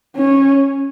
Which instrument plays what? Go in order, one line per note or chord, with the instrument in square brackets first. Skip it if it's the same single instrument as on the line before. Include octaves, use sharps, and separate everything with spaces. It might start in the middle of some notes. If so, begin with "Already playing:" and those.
[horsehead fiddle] C#4